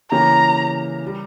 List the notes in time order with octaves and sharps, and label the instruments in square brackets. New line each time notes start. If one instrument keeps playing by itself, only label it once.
[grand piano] C#3 E3 A#3 C#4 G4 [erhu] A#5
[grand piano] G3